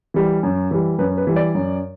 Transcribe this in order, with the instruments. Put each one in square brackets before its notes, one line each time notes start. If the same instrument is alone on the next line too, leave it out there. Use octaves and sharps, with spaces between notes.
[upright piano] E3 G3
F#2
E3 G3
F#2 B4
B4
E3 G3
D5
F#2